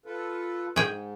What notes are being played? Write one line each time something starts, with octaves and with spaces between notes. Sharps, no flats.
F4 A4 B4
G#2 G#4 G5